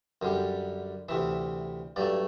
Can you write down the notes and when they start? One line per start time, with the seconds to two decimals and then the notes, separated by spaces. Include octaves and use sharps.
0.22 F#2 D3 G3
1.09 D2 C3 E3 E5
1.96 G2 F#3 A3 D5